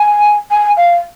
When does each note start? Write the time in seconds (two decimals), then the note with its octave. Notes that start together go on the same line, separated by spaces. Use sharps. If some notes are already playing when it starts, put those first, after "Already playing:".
Already playing: G#5
0.51 G#5
0.77 F5